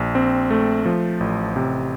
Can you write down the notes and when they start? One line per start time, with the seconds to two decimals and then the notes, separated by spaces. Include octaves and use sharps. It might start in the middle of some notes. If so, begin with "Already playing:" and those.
Already playing: A#1
0.15 C4
0.51 A3
0.86 F3
1.20 A1
1.56 C3